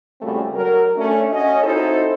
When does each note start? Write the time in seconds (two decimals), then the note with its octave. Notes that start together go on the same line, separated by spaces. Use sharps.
0.21 A#2 C#3 G3 A3 C4 F#4
0.55 F#3 A#4
0.96 A3 C#4 D4
1.32 C#4 F#4 D#5
1.64 C4 D#4 E4 F#4 A4 C5